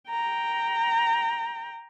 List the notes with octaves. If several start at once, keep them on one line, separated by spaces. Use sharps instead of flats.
G5 A#5